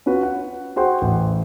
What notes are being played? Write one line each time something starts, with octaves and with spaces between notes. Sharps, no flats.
C#4 F4 F#4 B4
F#5
F#4 G#4 C5 F#5 G5 C6
A1